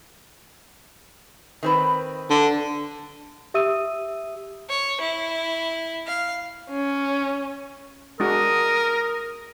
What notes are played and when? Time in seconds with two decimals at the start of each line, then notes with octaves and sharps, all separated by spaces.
1.63 D#3 C4 B4
2.30 D3
3.54 G4 E5 D#6 E6 D#7
4.69 C#5
5.01 E4
6.07 F5
6.70 C#4
8.20 G#3 D4 F#4 A#4 D#6